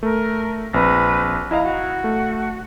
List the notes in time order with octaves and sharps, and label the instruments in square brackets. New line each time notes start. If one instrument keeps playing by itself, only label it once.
[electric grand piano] A3 [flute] A#4
[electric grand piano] A#1 C4 A#6 [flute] B4
[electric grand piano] E4 D#5 F5 [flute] A#5
[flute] F#4
[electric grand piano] A3